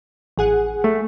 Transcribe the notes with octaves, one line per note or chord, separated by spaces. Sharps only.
A1 G#4 F#5
A3